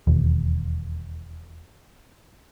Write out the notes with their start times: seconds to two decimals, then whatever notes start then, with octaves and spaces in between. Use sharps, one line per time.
0.07 E1 D#2